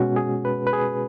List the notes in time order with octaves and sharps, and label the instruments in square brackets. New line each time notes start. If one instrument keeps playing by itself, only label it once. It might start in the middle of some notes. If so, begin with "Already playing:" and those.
Already playing: [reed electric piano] B2 G#3 C#4 F#4
G#4
B4
B4
G#4